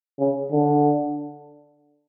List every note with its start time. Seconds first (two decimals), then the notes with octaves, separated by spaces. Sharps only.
0.19 C#3
0.52 D3